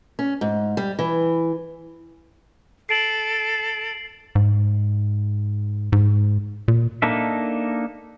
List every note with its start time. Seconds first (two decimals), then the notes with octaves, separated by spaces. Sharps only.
0.19 C#4
0.41 G#2
0.77 G3
0.99 E3
2.89 A4 C7 D7 F#7
4.35 G#2
5.92 G#2
6.68 A#2
7.02 A#3 D4 D#4 A4 E5